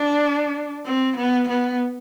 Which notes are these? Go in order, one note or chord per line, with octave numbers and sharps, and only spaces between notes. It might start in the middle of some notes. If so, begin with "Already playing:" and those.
Already playing: D4
C4
B3
B3